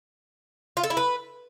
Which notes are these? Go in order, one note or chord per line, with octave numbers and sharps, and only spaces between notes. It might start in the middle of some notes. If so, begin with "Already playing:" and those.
F4
A4
E4
B4